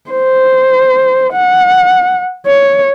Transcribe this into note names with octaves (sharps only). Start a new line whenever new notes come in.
C5
F#5
C#5